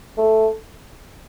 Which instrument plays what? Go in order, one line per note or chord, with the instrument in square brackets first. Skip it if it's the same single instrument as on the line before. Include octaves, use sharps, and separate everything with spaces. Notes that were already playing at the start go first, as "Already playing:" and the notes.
[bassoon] A3